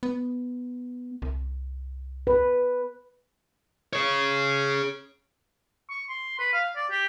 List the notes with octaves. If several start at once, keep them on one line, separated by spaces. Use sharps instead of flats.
B3
C2
B4
G#4 C#5
C#6
C6
B4
F5
D5
G4